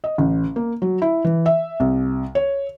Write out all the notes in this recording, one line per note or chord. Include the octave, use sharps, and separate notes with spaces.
D#5
A1
A#3
F#3
E4
E3
E5
C2
C#5